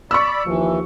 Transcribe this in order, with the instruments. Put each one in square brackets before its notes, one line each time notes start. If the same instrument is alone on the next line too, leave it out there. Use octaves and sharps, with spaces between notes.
[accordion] D5 B5 [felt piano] C#6 E6
[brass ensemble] D#2 F3 [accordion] E3